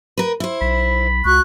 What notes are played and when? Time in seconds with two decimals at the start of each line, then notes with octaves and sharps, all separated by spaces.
0.17 A#4 B4
0.40 E4 C5
0.61 B1 B5
1.25 C#2 F#4 C#6 F#6